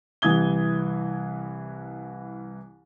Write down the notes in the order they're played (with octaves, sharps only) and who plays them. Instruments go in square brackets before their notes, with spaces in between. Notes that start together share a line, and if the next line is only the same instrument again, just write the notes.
[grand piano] C2 E3 D#6 G#6 G7